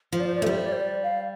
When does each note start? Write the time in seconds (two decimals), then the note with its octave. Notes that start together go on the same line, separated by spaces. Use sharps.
0.13 F3 C5
0.20 D5
0.27 C5
0.35 D5
0.42 A3 C5
0.46 G3 D5
0.58 C5
0.66 D5
0.73 C5
0.80 D5
1.03 F5